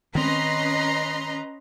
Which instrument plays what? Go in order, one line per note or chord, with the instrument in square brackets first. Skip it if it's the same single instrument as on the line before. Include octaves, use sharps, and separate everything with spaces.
[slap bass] D#3 C4 [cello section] C#4 B4 D#5 [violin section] A#5 C6